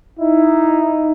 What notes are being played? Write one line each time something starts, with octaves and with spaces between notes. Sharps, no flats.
D#4 E4